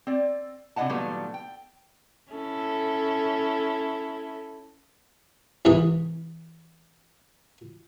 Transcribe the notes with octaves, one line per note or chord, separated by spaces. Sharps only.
C4 D5
C3 D4 E4 D#5 F#5 A5
A#2 D#3 F#3 G3 A3 B3
G5
C#4 E4 A4
C2 G#2 E3